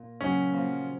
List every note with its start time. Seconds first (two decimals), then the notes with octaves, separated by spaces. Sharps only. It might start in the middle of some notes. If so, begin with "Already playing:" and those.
Already playing: A#2
0.20 C#3 F#3 A#3 C#4
0.53 F3 A#3 F4